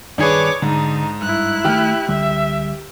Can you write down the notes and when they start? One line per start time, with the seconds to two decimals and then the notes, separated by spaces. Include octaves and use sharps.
0.18 G2 D#3 D4 G#4 B4 C#5 D6
0.62 G#2 D3 D4 D#4
1.22 G2 E4 F#6
1.65 D#3 F#3 A3 G4 F6
2.09 C#2 D3 G3 E5